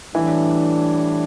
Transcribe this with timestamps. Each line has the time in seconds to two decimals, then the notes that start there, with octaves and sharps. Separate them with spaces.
0.14 A2 E3 G3 D4